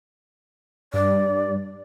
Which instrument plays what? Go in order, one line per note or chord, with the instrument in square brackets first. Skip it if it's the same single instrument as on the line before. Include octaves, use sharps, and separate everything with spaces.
[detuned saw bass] G2 [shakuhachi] D5